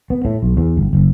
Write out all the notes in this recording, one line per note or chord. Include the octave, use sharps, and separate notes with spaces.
B3
A2
B1
E2
G1
F#1